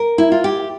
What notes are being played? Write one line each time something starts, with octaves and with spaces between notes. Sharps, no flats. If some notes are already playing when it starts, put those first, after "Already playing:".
Already playing: A#4
E4
F4
G4